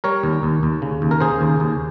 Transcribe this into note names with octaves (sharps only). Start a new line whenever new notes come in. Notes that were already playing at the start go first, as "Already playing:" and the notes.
G3 A#4 C#5
D#2
D#2
D#2
C#3
D#2
A#4
C#3 G#4 C5
D#2
D#2